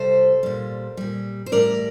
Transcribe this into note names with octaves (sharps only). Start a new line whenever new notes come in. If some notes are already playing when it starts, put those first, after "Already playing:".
Already playing: C3 G3 A4 C5
A#2 G3
A#2 G3
C5
A2 E3 G3 A#4 D5